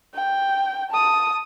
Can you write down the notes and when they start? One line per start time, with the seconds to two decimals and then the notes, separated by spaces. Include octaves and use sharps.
0.15 G5
0.91 A5 D#6